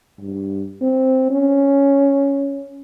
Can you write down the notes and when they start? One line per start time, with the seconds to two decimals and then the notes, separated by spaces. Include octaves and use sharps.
0.20 G2
0.81 C4
1.30 C#4